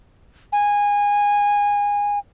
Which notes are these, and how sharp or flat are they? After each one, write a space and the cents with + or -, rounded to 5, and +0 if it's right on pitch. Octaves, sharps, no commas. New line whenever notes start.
G#5 -20